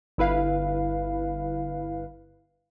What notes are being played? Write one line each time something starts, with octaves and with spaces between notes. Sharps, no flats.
G1 E4 B4 F5